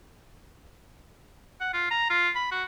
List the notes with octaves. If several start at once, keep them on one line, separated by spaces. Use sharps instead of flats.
F#5
F4
A#5
F4
B5
F#4